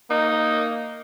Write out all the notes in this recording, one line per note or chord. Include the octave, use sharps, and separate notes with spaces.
A#3 D#4